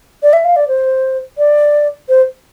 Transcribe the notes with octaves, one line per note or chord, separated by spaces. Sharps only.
D5
E5
F5
D5
C5
D5
C5